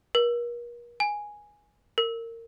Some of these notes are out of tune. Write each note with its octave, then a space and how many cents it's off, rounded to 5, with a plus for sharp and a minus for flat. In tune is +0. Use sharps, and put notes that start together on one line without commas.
A#4 +40
G#5 +0
A#4 -25